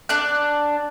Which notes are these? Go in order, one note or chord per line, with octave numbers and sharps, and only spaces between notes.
D4 D5 F#6